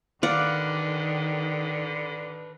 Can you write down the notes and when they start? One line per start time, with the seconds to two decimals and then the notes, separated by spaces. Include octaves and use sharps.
0.23 D3 D#3 A4 B4 D5 F5 F#5